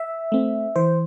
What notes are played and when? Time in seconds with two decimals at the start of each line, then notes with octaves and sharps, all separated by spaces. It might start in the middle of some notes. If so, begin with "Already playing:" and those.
Already playing: E5
0.32 A3 C4
0.76 E3 C5